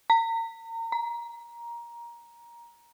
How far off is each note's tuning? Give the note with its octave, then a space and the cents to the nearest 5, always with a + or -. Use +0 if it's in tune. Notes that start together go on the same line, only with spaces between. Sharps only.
A#5 -35
A#5 +15